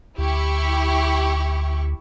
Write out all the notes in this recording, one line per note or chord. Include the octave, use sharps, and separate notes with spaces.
D2 E4 G4 C#6